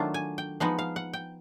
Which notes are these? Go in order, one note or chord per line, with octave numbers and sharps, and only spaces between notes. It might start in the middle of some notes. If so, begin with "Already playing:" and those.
Already playing: D#3 F#3 A3 D4 F4
G#5
G5
F3 G#3 B3 D#4 F#5
F5
F#5
G5